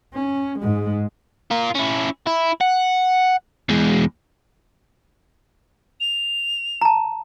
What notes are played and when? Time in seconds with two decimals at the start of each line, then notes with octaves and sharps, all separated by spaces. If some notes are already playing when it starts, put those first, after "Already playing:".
0.14 C#4
0.59 G#2 G#3
1.51 F4 A#4
1.75 C#4 E4
2.27 E4
2.61 F#5
3.69 E2 G#3
6.00 F7
6.81 A5 A#5